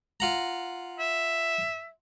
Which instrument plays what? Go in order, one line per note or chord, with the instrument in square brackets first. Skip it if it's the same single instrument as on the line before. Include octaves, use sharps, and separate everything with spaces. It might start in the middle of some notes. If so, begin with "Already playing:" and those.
[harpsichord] F4 F#5 A#5
[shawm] E5